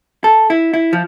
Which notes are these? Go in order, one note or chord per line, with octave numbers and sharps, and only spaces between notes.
A4
E4
E4
F3